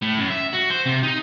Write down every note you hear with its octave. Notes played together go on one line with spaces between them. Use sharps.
A2
F#2
E5
F#4
C5
C3
D#4